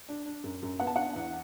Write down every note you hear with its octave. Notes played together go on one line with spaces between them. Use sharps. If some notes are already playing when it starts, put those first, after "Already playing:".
D4
D4
F#2
F#2
B3 F#5
A5
D4 F#5
E2